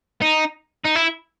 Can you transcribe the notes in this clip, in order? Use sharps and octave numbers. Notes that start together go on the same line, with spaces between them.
D#4
D#4
E4